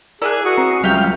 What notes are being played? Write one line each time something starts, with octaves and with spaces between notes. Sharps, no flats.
E4 G#4 A#4 D5 G#5 F#6
F#4 D#6
C4 A#5 C7
C#2 F#3 G3 E5 F5 G5 F6